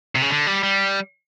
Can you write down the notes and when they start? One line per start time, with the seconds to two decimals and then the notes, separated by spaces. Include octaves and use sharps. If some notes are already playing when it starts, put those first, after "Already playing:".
0.15 C3
0.22 C#3
0.30 D3
0.47 G3
0.63 G3